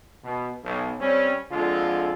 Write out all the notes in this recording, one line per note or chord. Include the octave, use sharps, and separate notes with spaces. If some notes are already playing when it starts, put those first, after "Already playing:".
B2
B1
G3 C4 C#4
F2 D3 G#3 F4